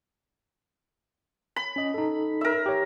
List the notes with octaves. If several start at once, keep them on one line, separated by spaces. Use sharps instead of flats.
B5
C#4 D#5
D#4 A4
A#4 E5
G4 C#5